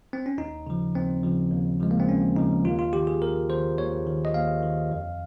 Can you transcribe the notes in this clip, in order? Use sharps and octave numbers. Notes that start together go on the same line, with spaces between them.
C4
C#4
D#2 D#4
C#3 F3
D#2 C4
C#3 F3
D#2
C#3 F3 G#3
A#3
C4
D#2 C#4
C#3 F3 D#4
D#2 F4
F4
D#3 G4
G#4
D#2 A#4
D#3 C5
D#2 C#5
D#3
D#5
D#2 F5
D#3
F2